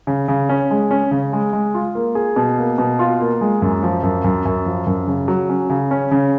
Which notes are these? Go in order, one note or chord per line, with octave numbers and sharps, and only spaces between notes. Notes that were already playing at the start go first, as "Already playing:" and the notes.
C#3
C#3
C#4
G#3
C#4
C#3
G#3
G#3
F4
A#3
G#4
B2
A#3
B2
F4
A#3
G#3
F#2
F3
F#2
F#2
F#2
F3
F#2
C#3
F#3
C#4
C#3
C#4
C#3